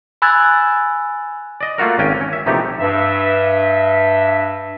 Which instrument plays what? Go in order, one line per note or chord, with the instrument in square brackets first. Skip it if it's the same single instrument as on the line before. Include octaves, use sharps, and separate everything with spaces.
[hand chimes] G#5 B5 E6 F#6 G#6 A6
[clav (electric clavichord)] D5 D#5
A3 A#3 F4 F#4 A#4
G#1 C#4 G5 G#5
C#4
E5
A#1 C3 E3 A3 D#4 G4
[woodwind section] G2 E5